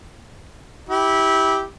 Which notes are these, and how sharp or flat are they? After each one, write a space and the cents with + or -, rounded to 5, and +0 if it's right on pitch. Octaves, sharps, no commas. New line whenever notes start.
E4 -20 G4 +0